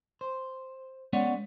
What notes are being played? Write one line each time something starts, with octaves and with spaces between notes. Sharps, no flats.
C5
G#3 B3 C#4 C#5 D5 F#5